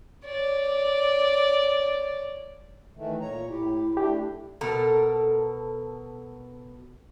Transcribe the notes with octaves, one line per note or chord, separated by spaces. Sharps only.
C#5 D5
D#3 E3 A3
A#2 C#5 A#5
A2 E4 G4
A3 D4 G4
B2 A4 A#4